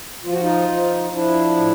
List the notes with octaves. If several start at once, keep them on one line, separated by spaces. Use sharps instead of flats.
F3 F4
F#4
D#4 F4
F3
F3 D4 E4
A2